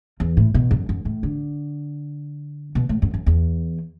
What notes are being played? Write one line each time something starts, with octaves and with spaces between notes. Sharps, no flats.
E2
A2
B2
F#2
F#2
A2
D3
B2
A2
F#2
F#2
E2